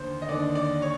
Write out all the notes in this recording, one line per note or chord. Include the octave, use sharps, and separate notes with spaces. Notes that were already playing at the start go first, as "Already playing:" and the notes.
Already playing: D#2 D3 C5
D#5
D#2 D3 D5
D5
C#5